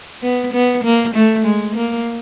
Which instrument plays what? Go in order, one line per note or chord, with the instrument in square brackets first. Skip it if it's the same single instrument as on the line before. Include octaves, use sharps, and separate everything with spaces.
[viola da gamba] B3
B3
A#3
A3
G#3
A#3